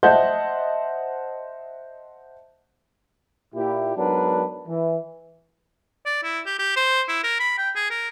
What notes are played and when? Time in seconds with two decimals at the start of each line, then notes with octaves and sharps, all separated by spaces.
0.03 C5 D#5 E5 F#5 A5 G6
3.55 A#2 E4 G4
3.97 G#2 F#3 B3 D4 A#4 B4
4.68 E3
6.06 D5
6.23 E4
6.46 G4
6.59 G4
6.76 C5
7.09 E4
7.23 A#4
7.39 B5
7.58 G5
7.75 G#4
7.90 A#4